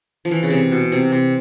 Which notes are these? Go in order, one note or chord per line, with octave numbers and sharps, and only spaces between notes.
F3
E3
C#3
C3
B2
C3
C3